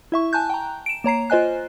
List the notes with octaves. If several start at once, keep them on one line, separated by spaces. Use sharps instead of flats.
E4 E5 C#6
G#5 A5 F#6 G6
G5 A#5
D7 E7
A#3 C#5 A#5 C7
F4 C5 D#5 G#5 F#6